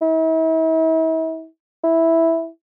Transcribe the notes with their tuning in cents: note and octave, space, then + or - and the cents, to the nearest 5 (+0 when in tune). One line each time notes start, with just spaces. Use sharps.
E4 -40
E4 -5